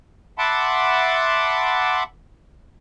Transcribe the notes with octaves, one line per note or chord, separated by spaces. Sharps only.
E5 F#5 A5 B5 C6 D6